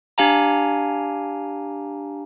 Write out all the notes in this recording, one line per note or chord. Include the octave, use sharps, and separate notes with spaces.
D4 G4 F5 G#5 A#5